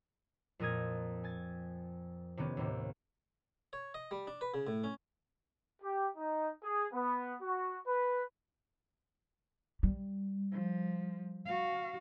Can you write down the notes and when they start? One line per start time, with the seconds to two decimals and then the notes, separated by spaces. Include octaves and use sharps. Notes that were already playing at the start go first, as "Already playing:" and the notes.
0.59 F2 A#2 A#4 D#6 G#6
1.24 G#5 A6
2.37 C3 D#3 B3 C#4
2.57 D#2 A2 C3
3.73 C#5
3.94 D#5
4.11 G3
4.27 D4
4.41 B4
4.54 C#3
4.67 A2
4.84 C#4
5.82 G4
6.16 D#4
6.63 G#4
6.93 B3
7.42 F#4
7.87 B4
9.83 G3
10.51 F3
11.46 F#4 F5